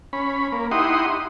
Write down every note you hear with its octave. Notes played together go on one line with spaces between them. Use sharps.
C#4 B5
A#3
D#4 E4 G4 F#5 C6 D#6